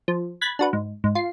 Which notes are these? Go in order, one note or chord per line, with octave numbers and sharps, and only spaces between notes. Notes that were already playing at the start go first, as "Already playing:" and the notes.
F3
B5 F#6 G#6 A6 B6
D4 F#4 B4
G#2
G#2
F4 C7